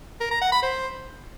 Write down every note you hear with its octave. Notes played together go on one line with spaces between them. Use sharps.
A#4
A#5
F#5
B5
C5